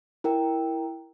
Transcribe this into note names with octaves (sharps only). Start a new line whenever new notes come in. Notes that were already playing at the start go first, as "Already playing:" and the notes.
E4 A#4 G5